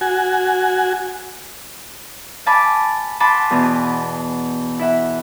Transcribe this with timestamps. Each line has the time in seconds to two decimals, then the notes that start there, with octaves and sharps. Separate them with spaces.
0.01 F#4 G#5
2.46 F5 G#5 A5 B5 D6
3.20 F#5 G#5 A5 B5 C6 D6
3.51 E2 B2
4.79 E4 E5 F#5